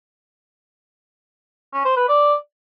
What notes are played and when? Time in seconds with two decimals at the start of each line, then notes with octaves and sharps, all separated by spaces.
1.73 C#4
1.85 C5
1.97 B4
2.08 D5